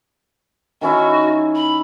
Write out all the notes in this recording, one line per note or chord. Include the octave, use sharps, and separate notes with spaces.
D#3 C#4 E4 F#4
B5